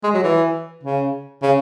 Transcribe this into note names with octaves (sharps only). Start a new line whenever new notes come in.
G#3
F#3
E3
C#3
C#3